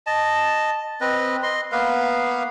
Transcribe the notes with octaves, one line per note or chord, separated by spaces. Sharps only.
D#5 A5
C4 B4 D#5
D#5 C6
A#3 B3 B4 F5